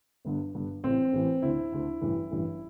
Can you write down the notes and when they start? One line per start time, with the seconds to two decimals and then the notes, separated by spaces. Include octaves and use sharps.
0.25 G1 G2 D3
0.54 G1 G2 D3
0.84 A1 A2 E3 C4
1.13 A1 A2 E3
1.42 D2 D3 E4
1.72 D2 D3
2.01 A1 G2 E3
2.31 A1 G2 E3